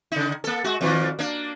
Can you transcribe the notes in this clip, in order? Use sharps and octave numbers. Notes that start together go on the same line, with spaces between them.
C#3 D#4
A#3 A4
G#3 F#4
F2 A#2 D#3
A#3 D4